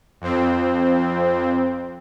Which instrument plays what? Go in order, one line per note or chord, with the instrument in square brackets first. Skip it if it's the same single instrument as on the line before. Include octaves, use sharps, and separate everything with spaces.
[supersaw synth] F2 C4